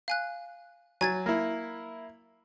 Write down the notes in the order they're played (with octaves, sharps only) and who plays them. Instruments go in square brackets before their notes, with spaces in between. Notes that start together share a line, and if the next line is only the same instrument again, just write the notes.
[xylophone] F5 G#5 F#6
[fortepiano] F#3 [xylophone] G#5 G#6 A6
[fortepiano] A#3 E4